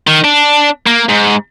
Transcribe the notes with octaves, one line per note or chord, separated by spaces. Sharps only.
D#3
D4
A#3
G#2